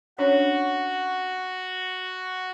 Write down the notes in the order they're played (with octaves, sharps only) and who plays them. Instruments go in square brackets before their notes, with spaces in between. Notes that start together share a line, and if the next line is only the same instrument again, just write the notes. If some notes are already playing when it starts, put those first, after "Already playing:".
[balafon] C#4 D4 C#5 [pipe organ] F#4